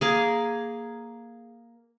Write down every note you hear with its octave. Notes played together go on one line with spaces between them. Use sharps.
A#3 G#4